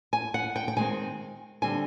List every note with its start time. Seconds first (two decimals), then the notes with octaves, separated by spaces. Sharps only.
0.13 G#5
0.34 F#5
0.56 G5
0.68 G5
0.77 D#3 G#3 C4 G#5
1.62 D3 G3 C4 E4 G#5